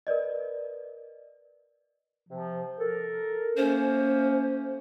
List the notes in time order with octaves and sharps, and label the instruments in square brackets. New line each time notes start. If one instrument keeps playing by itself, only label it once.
[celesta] A#4 B4 D5 D#5
[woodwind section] C3 F3
A4 A#4
[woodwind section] A3 A#3 C#4 [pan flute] C5